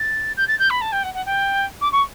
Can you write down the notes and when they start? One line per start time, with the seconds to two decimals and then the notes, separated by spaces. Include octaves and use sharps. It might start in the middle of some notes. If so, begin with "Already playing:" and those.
Already playing: A6
0.37 G6
0.48 A6
0.59 G6
0.70 B5
0.81 A5
0.92 G5
1.04 F#5
1.14 F#5
1.26 G5
1.81 D6
1.92 C#6